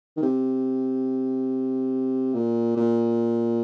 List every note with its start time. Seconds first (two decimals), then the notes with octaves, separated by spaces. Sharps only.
0.17 D#3
0.22 C3
2.34 A#2
2.77 A#2